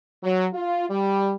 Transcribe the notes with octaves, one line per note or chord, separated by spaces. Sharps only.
F#3
F4
G3